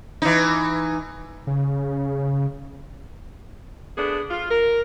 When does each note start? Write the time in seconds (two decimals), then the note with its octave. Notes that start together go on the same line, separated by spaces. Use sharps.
0.22 E3 D#4
1.47 C#3
3.97 A3 B3 D4 G#4
4.30 F4
4.49 A#4